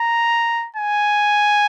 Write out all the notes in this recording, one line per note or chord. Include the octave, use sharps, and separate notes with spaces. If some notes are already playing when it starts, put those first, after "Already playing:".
Already playing: A#5
G#5